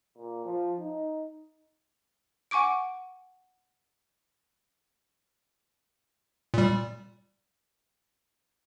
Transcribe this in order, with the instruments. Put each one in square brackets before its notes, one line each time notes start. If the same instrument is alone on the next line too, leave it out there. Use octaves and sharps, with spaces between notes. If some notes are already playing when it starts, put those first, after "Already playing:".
[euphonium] A#2
F3
D#4
[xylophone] F#5 G#5 C#6 D6 D7
[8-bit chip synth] A#2 G3